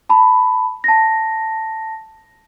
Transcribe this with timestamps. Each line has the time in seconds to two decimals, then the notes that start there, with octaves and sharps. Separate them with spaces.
0.09 A5 B5
0.84 A5 A#6